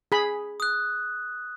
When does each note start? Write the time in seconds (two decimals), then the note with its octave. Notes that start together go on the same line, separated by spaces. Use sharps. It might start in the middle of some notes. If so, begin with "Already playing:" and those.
0.12 G#4 B5
0.60 D#6 F#6